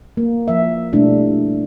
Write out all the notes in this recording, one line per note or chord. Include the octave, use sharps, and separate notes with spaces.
A#3
F3 E5
B2 G3 A3 D4 E4